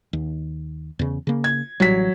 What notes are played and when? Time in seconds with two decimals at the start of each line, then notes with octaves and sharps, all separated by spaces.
0.13 D#2
0.99 E2 C#3
1.27 C#3 A#3
1.44 G#6
1.80 A1 F#3 G3 B6